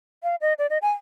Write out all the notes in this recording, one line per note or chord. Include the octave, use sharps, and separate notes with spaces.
F5
D#5
D5
D#5
G#5